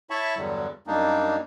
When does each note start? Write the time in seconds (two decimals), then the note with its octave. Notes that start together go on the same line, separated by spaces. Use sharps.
0.10 E4 C#5 E5 A5 B5 C#6
0.37 E2 G2 D3 F#3 G3
0.87 F#2 G3 A#3 D4 D#4